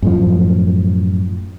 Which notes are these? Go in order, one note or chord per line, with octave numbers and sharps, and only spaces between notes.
F#2 A2 F3